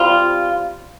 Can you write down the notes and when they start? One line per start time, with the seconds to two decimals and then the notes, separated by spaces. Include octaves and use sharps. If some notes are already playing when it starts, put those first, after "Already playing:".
Already playing: G3 C4 F4